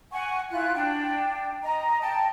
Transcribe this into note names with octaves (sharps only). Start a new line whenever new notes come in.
F#5 G#5 C#6
E4 F4 F#6
D4 G5
D#5 A#5
G5 A5